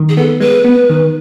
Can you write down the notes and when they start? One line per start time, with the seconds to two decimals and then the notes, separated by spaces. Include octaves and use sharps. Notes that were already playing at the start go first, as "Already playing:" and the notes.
Already playing: D#3
0.09 G#4
0.17 B3 A4
0.40 G#3 B4
0.64 B3
0.90 D#3